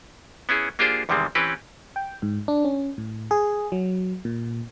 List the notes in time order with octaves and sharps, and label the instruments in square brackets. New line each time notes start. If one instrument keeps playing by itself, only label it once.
[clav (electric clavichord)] B3 C#4 E4 G#4
A#3 D4 F4 G4 G#4 C5
E2 C3 D#3 G3 G#3 C4
E3 C4 C#4 G4 B4
[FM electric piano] G5
G#2
D4
C#4
A2
G#4
F#3
A#2